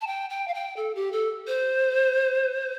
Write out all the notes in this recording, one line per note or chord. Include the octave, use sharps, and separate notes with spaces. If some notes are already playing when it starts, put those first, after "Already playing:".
A5
G5
G5
F5
G5
A4
G4
A4
C5